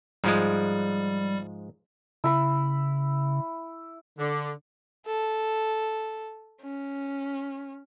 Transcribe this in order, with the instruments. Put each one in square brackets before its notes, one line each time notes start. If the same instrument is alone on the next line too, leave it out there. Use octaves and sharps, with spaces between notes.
[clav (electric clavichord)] G#2 F3 G#3 [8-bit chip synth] G3
[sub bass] C#3 [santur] E4 B5
[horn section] D3
[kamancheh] A4
C#4